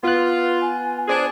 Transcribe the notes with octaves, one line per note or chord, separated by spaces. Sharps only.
B3 F4 B4 F#6
G#5
D4 G#4 C5